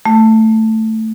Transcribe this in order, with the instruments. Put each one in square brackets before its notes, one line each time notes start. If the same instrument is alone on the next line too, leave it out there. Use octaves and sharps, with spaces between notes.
[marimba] A3